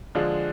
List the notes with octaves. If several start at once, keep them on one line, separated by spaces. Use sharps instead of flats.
D3 F3 G#3 D4 F4